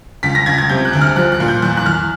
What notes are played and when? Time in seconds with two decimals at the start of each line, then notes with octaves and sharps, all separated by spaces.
0.23 C#2 B6
0.35 A#6
0.46 C#2 G#6
0.58 G#6
0.69 C3 G6
0.85 F#6
0.93 D2
1.01 F6
1.16 F3 F#6
1.32 F#6
1.40 A#2
1.48 G6
1.62 E2 F#6
1.77 F#6
1.86 E2 F6